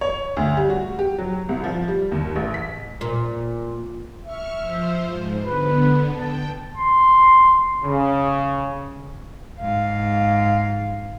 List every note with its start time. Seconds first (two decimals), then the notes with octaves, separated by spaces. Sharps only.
0.01 C#5
0.37 D2
0.57 G3
0.70 F#4
0.99 G4
1.18 F#3
1.49 C2
1.64 F3
1.88 G3
2.12 D#2
2.36 A1
2.54 B6
3.01 A#2
4.25 E5 C#6 F6
4.61 F3 C5
5.05 G#2
5.44 D3 B3 B4
6.15 G5 A5
6.78 C6
7.84 C#3
9.61 G#2 F5